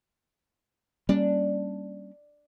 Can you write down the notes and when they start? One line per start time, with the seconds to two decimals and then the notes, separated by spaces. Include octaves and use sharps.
1.09 G3 A#3 C#4 D4